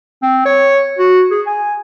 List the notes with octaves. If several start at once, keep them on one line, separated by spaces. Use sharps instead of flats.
C4
C#5
F#4
G#4
G#5